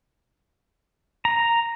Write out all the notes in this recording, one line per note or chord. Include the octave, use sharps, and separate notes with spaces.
A#5